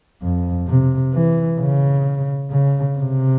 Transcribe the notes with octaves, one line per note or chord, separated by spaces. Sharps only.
F2
C3
E3
C#3
C#3
C3